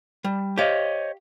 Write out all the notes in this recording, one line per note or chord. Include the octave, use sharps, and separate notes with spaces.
G3
G4 C5 C#5 D#5 F5